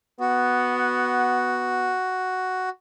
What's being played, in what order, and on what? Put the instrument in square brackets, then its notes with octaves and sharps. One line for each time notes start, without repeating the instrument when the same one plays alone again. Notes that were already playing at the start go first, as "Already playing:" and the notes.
[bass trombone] B3 [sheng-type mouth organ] F#4